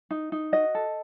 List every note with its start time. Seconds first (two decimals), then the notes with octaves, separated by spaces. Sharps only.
0.11 D#4
0.32 D#4
0.52 F#4 D#5
0.75 A4